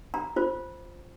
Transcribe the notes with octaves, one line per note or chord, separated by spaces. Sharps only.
A#5
F4 C5